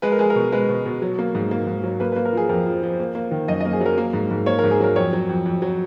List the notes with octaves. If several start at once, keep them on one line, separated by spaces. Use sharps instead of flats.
G#3 B4
A#4
G#3 G#4
A#4
B2
G#3 B4
B2
B2
F#3
A#3
G#2
A#3
G#2
F#3
A#3 B4
B4
A#3
A#4
F3 G#4
F2 A#4
F3
F3
A#3
A#3
D#3
F#2 D#5
D#5
A#3
G#4
F#3
A#4
A#3
G#2
G#2
A#3 C#5
A#4
G#2
G#4
F#3 A#4
F2 C#5
F#3
F2
F2
F#3